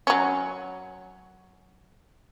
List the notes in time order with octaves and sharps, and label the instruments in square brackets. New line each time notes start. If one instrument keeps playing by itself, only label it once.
[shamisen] F#3 C#4